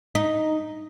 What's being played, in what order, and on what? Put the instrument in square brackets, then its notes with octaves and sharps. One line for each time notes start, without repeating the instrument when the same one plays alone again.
[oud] D#4